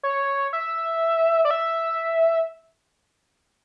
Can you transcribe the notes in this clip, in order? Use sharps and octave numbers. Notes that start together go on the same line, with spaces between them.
C#5
E5
D5
E5